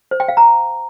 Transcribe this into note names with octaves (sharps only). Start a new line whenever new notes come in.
C5
G5
F5
A#5